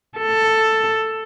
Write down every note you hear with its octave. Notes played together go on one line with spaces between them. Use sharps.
A4